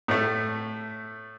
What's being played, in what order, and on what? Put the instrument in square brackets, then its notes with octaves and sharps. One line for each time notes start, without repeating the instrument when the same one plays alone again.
[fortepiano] A2 A3